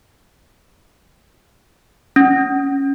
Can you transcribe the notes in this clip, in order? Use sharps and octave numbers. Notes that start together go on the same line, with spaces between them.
C#4